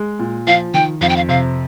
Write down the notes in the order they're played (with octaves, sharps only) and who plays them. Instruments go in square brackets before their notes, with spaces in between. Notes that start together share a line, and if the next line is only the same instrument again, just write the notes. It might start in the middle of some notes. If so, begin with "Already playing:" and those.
Already playing: [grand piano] G#3
A#2
[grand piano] F3 [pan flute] F5
[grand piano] D#3 [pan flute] G5
[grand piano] F2 [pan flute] F5
[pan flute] G5
F5
[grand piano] C3 [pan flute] F5